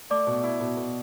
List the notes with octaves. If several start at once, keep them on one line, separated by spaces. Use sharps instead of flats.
A3 D5 D6
B2
E4
B2
B2